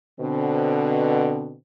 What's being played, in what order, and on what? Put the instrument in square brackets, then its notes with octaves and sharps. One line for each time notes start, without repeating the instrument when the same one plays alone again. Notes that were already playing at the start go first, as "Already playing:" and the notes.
[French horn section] B2 D3 C4